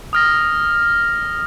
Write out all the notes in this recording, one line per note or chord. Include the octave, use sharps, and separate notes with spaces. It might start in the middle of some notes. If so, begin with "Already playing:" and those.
D#6 F6 A#6